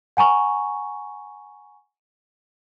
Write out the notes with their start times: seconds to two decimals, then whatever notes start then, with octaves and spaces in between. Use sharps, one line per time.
0.17 F#5 G#5 A#5 C#6